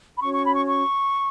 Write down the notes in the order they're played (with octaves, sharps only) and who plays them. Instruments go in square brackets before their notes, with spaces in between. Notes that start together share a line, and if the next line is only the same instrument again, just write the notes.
[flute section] B5
C#4 F#4 C#5 C#6
C#6
B5
C#6
C#6